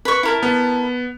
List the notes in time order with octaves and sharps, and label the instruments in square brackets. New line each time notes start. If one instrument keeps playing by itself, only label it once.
[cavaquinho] B4 C#6
E4 A#4 A5
[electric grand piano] B3